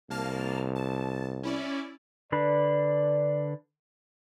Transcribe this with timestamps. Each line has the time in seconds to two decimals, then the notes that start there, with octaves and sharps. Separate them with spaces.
0.10 C2 A#3 A5 F6
0.76 A5
1.43 C#4 E4 D5
2.32 D3 D4 B4 D5